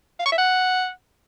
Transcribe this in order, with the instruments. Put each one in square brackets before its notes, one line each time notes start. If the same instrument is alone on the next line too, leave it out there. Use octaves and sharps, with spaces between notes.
[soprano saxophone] F5
C#6
E5
F#5